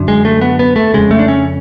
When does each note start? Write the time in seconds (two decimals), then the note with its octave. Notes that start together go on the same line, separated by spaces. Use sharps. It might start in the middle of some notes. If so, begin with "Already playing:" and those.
Already playing: F#2 D3
0.08 G#3
0.25 A3
0.41 B3
0.59 B3
0.76 A3
0.94 F2 C#3 G#3
1.11 A3
1.19 D4
1.28 C#4